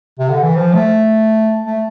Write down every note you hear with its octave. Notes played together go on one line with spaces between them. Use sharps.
C3
D3
E3
F3
A3
A3